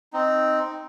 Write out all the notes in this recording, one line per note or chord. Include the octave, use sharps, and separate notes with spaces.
C4 D#4